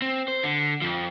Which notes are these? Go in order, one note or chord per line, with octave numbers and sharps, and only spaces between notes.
C4
C5
D3
F2 F3